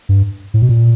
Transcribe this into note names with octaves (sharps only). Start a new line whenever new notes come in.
G2
A2
B2
A#2